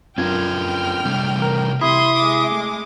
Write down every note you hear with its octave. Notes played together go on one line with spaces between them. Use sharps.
F#2 C4 D4 F4 A#4 G5 F6 G#6
C3 G3 A3
E3 A#4
C3 E4 E5 C6 D#6
G#3 D6
A3